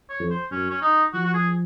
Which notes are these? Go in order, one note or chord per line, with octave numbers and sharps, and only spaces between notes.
C#5
F2
C5
F#2 C#4
C#4
D#4
F3 F#4
F#4
G#4